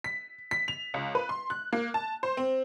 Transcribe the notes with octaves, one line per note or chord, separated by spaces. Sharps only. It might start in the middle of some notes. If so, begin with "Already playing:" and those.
B6
B6
F7
C#2
B4
C6
F#6
A#3
A5
C5
C4